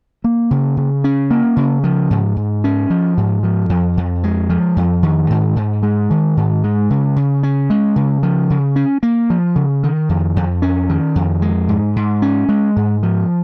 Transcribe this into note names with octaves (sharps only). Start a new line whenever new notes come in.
A#3
C#3
C#3
C#4
A#3
C#3
F3
G#2
G#2
C#4
F3
G#2
F3
F2
F2
G#3
F3
F2
D#3
G#2
G#2
G#3
D#3
G#2
G#3
C#3
C#3
C#4
G#3
C#3
F3
C#3
C#4
A#3
F3
C#3
D#3
F2
F2
C#4
D#3
F2
G#3
G#2
G#2
C#4
G#3
G#2
F3